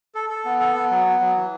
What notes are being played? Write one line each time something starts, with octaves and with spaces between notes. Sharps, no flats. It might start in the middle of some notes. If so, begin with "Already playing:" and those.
A4
A4
B3
A4
B3
F#3
B3
F#3
E3